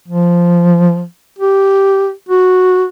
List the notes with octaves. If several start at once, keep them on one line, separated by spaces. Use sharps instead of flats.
F3
G4
F#4